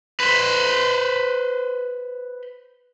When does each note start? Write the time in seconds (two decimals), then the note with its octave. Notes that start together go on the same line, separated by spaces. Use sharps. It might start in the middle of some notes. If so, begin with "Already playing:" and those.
0.20 B4 C5